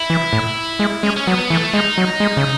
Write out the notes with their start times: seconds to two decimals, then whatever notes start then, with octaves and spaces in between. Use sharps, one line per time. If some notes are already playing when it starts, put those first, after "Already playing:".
Already playing: E4
0.10 E3
0.33 A2
0.79 G#3
1.03 G#3 C#4
1.16 C#4
1.27 F#3 B3
1.50 E3 A3
1.73 G#3 D#4
1.98 F#3
2.20 G#3
2.37 C#3